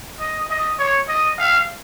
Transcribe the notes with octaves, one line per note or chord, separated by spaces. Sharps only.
D#5
D#5
C#5
D#5
F5